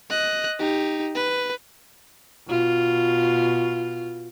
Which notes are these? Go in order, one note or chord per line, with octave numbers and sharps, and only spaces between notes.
D#5 F#6
D#4 G4
B4
B2 F4